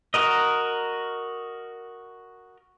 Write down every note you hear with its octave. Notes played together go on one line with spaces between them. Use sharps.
F#4 A#4 D#5